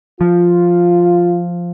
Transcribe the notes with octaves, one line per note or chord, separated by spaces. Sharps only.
F3 F4